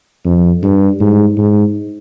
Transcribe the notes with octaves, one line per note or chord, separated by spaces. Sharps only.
F2
G2
G#2
G#2